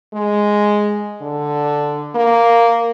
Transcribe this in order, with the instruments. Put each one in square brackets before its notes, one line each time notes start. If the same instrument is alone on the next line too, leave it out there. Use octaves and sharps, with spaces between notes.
[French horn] G#3
D3
A#3